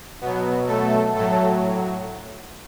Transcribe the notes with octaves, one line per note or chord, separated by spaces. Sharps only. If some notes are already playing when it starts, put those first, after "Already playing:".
B2 F#3 B3
A3 A4
A2 F#3 A3 A4